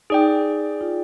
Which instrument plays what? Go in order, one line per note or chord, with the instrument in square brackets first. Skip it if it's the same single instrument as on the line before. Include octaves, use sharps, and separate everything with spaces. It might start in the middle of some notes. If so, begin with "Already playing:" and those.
[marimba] D#4 [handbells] G#4 D5 G5
[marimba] F4